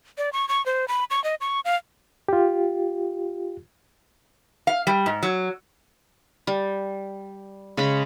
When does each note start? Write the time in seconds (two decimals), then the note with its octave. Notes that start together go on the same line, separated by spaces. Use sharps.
0.18 D5
0.33 C#6
0.49 C#6
0.66 C5
0.88 B5
1.11 C#6
1.24 D#5
1.41 C#6
1.65 F5
2.29 F4 G4
4.67 F5
4.87 G3
5.06 G#2
5.23 F#3
6.47 G3
7.77 C#3 G#3 B5